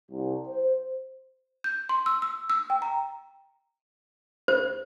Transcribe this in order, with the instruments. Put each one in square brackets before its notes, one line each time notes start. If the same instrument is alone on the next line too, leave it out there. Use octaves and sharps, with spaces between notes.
[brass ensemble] C2
C5
[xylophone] G6
C6
E6
E6
E6
G5
A#5
[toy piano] C5